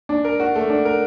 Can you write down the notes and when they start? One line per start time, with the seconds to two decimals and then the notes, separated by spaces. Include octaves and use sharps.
0.09 D4
0.25 A#4
0.40 F#4
0.56 A3
0.70 D4
0.85 A#4